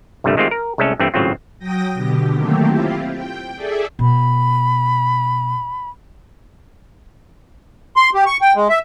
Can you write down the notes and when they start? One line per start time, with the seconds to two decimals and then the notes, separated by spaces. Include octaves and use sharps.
0.24 C2 G2 A#2 D3 G3 A3
0.37 D#3 G#3 A3 C4 F4 G4
0.51 A#4
0.78 C2 G#3 A3 C#4 A4
1.00 G2 E3 A3 C4 E4
1.14 G#1 A2 C#3 F#3 C4 F4
1.59 F#3 G5 D#6 A#6
1.94 B2 D3 G4
2.34 D#3 F#3 A3 A#3 C4 G4
2.67 C4 E4 F4 G4
3.12 G5
3.54 G#4 A4 D5 E5
3.99 B2 B5
7.96 C6
8.14 G4
8.26 C#6
8.41 G5
8.56 G#3
8.69 E5